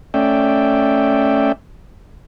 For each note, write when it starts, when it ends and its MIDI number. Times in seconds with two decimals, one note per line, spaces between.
0.14 1.52 57
0.14 1.52 61
0.14 1.52 74
0.14 1.52 76
0.14 1.52 79